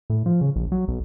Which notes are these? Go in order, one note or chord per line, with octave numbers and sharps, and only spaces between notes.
A2
F3
C#3
A#1
F#3
B1